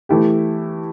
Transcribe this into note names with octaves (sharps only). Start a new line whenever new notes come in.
E3 A3 E4 G4